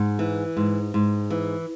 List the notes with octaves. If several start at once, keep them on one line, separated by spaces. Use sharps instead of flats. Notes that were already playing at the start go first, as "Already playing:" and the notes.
Already playing: G#2
E3
G#2
G#2
E3